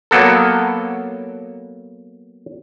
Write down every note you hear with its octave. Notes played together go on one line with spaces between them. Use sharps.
F#3 A#3 B3 A4